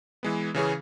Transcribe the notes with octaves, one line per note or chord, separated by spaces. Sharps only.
E3 G#3 B3
C#3 E3 C#4 G#4